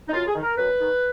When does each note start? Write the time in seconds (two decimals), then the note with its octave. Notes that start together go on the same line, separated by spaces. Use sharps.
0.09 D#4
0.13 F#2 F4
0.27 G#4
0.35 D#3
0.43 A#4
0.57 F#2 B4
0.79 D#3